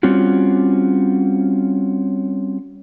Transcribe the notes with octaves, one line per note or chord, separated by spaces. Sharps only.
G3 C4 C#4 F4 F#4